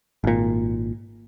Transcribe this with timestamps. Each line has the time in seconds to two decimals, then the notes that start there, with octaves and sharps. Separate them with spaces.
0.24 G#1 A#2